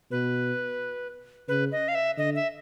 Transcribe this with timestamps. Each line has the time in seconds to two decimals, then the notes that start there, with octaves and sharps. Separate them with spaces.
0.11 B2 B4
1.48 C#3 B4
1.72 D#5
1.88 F5
1.95 E5
2.17 D3 D#5
2.35 E5